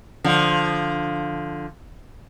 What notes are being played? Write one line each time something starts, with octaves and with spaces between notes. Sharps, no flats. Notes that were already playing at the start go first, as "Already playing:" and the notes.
D3 F3